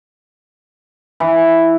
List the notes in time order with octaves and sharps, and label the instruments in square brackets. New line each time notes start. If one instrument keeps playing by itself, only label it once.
[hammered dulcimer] E3